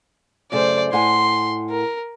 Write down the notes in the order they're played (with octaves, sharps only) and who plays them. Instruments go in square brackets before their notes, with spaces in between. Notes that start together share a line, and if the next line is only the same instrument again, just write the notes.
[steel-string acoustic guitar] F#2 C#3 A3 [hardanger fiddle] C5 D5
[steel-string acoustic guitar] A2 F#5 G#5 [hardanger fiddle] C6
[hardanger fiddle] A#4